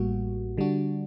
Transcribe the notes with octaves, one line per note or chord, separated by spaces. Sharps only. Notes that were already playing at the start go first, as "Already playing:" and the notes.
Already playing: A1 A2 G3 A#3 F#4
D3 G3 D4 F#4